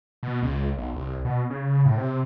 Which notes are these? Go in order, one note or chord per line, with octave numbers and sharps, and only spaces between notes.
B2
C#2
B1
C2
B2
C#3
A2
C3